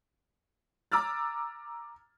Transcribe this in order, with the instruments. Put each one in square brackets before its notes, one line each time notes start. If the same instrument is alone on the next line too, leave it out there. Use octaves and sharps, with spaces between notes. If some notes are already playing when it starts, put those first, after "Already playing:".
[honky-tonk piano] A#5 D6 E6 F6 A6